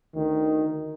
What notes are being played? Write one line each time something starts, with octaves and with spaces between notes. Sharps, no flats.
D2 D#3